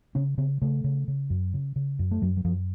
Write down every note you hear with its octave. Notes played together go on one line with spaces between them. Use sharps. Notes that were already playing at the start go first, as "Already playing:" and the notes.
C#3 C#4
C#3 C4
C#3 A3
C#3
C#3
F#2
C#3
C#3
F#2
A3
F#2 F#3
F#3
F#2 F3